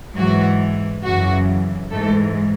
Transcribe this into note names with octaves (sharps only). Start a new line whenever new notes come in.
G#2 E3 F#3 F#4
F#2 C#3 E3 F#3 F#4
G#2 E3 A3 A4